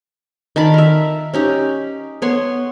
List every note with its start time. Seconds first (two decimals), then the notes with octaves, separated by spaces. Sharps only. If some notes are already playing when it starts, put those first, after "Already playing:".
0.56 D#3 D5 A5 B5
0.74 A#4 E5
1.33 C#4 D#4 G4
2.22 B3 C#5 C6